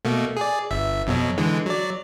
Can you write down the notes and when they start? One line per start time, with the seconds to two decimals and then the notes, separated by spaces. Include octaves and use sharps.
0.05 B2 A3 A#3
0.37 G#4 D5
0.71 G1 E5
1.07 F2 B2 F#3
1.38 D3 E3 G#3
1.66 F#3 D5